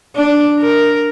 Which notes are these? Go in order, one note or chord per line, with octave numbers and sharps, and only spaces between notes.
D4
A#4